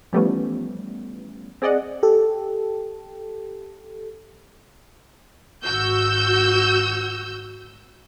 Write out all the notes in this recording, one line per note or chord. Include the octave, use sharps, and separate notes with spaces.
E3 F3 G3 A3 B3 C#4
C4 G#4 D5 D#5 F#5
G4 A4
G#1 F#4 E6 G6